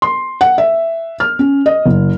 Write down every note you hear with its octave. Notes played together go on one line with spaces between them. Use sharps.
C6
F#5
E5
F6
C#4
D#5
F#1